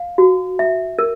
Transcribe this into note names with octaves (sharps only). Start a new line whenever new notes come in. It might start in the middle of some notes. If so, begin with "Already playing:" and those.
Already playing: F5
F#4
E5
A#4